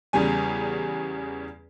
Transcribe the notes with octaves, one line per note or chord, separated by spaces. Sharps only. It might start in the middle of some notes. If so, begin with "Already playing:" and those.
E2 C#3 G3 G#5